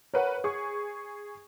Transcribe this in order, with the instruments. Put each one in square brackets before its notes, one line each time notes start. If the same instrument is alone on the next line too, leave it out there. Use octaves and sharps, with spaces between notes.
[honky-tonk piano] A#4 B4 F#5 [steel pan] C#5
[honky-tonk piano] G#4 C#6